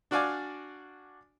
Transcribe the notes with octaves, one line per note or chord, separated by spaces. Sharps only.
D4 F#4 D5 F5 G#5 D6